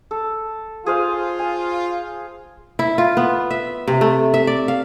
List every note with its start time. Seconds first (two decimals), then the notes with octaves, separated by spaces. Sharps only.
0.11 A4
0.86 F4 G#4 C5 F5
1.39 G#5
2.79 E4
2.98 F4
3.17 B3
3.50 E5
3.88 C3
4.01 A3
4.34 E5
4.47 D5
4.68 F5